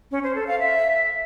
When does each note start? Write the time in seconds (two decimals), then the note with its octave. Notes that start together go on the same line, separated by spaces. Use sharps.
0.11 C#4
0.23 C5
0.35 A4
0.47 F5
0.59 E5